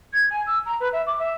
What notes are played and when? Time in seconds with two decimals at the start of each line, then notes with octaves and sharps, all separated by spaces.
0.13 G#6
0.30 G#5
0.47 E6
0.66 A#5
0.80 B4
0.93 E5
1.07 D6
1.19 E5